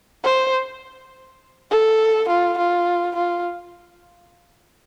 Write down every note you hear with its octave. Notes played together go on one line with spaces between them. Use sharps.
C5
A4
F4
F4
F4